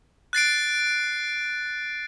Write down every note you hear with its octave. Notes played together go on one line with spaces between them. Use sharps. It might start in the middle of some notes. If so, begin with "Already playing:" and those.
F#6 A6 C7 D7